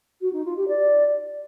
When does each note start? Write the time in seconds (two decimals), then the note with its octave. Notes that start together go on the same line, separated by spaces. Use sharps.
0.21 F#4
0.33 D#4
0.45 F4
0.57 G4
0.68 D5